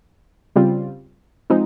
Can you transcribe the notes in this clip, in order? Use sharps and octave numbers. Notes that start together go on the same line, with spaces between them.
C#3 G3 C4 F4
F3 G#3 C4 D#4